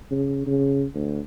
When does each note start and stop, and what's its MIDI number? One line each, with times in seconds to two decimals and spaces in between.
0.11 0.42 49
0.47 0.85 49
0.94 1.20 38